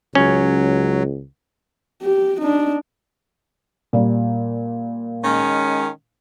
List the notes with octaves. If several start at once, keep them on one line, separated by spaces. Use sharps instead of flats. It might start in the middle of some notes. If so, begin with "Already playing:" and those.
C#2 F#3 C#4
G4
D4 D#4
A#2 G3 A#3
D#3 G#3 C#4